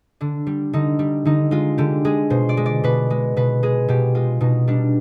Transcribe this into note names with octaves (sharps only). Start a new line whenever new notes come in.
D3 D4
G3
D3 D#4
G3
D3 D#4
G#3 F4
D3 G4
G#3 G#4
B2 C5
D5
G#3
D5
B2 B4
G#3
B2 B4
G#3 G#4
B2 G4
G#3 F4
B2 D#4
G3 D4